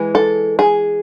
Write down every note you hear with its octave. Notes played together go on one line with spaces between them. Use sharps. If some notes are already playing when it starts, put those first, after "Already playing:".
Already playing: E3 G#3
A4
G#4